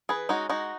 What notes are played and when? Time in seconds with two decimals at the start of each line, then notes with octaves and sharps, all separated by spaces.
0.09 E3 G#4 B4
0.29 G#3 C#4 D#4 F#4
0.49 G#3 D#4 F#4